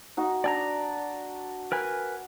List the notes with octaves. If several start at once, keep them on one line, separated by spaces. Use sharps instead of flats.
D#4 F#4
D4 D5 G#5 A#5
A#4 B4 G#5